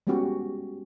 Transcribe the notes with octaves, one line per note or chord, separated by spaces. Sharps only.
G3 G#3 B3 C#4 F#4 G4